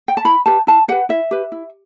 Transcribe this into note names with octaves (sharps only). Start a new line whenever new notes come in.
G5
A5
E4 B5
G4 B4 A5
E4 A5
G4 B4 F#5
E4 E5
G4 B4
E4